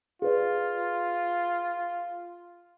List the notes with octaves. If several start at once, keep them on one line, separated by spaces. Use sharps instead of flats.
F4 G#4 B4 D5